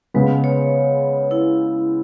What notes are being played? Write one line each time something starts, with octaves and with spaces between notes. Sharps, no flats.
C#3 G#3 B3 B4
C#5
E4